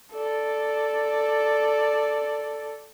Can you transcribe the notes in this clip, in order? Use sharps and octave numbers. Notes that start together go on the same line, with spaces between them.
A4 D5